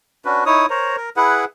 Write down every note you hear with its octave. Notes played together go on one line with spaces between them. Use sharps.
C#4 D4 F#4 B4
D#4 E4 C#5 D#6
A#4 C5 C#5 A#5
A#4
E4 G#4 B4 F#5